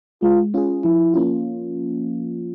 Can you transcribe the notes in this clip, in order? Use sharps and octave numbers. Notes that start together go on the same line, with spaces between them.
G#3 F4
C#4 F4 G#4
F3 E4
A#3 C#4 F4